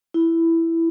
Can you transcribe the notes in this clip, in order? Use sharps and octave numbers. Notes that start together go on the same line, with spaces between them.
E4